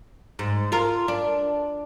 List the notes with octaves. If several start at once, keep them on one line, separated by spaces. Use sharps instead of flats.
G#2
F4 A#4
D4